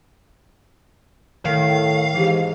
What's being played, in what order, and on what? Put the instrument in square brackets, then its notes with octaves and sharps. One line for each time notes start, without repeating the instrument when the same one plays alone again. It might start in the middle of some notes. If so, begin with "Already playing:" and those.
[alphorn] A2 [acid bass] D#3 [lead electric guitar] F5
[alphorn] G#2 [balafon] E3 G4